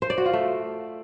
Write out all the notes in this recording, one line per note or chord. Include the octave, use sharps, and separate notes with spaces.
C5
D5
F#4
F4
A3